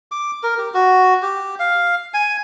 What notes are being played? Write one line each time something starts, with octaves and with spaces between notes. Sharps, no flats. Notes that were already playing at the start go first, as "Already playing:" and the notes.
D6
A#4
G4
F#4
G4
F5
G#5